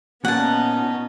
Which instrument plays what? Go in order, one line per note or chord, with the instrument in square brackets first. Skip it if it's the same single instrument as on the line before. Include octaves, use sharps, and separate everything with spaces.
[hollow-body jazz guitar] A#2 [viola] B3 D#4 [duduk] C#4 [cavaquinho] F#5 A5